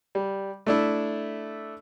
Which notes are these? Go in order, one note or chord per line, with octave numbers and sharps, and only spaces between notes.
G3
A3 D4 E4